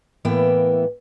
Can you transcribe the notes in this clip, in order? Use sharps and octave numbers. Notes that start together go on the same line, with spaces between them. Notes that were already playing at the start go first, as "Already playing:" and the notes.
A2 E3 A#3 B3 E5 G5